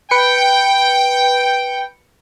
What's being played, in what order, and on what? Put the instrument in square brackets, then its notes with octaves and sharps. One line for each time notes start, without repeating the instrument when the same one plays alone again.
[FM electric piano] B4 C#7 [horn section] G5